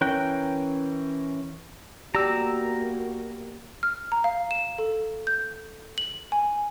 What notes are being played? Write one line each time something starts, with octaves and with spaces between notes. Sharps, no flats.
E3 C#4 A#4 G5 F#6
A#3 B3 F#4 G4 D5 A#5 E6
F6
A#5
F5
E7
A4
G6
F#7
G#5